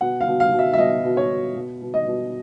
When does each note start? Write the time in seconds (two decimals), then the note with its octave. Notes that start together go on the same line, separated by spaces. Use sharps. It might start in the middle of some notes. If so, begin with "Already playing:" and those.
0.01 B2 F#5
0.21 F5
0.27 B2
0.40 F5
0.52 B2
0.59 E5
0.73 E5
0.78 B2 D#5
1.04 B2
1.17 C#5
1.30 B2
1.56 B2
1.82 B2
1.94 D#5
2.07 B2